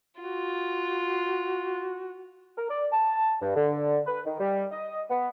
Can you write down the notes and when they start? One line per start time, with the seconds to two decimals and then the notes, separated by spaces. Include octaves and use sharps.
0.21 F4 F#4
2.57 A#4
2.69 D5
2.92 A5
3.41 G2
3.56 D3
4.07 B4
4.26 D#3
4.40 G3
4.72 D#5
5.11 B3